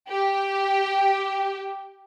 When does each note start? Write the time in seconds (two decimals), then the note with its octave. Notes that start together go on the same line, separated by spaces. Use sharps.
0.10 G4